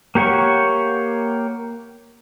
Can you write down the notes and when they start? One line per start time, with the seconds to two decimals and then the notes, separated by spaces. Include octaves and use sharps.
0.15 A#3 G4 C#5 F#5 C#6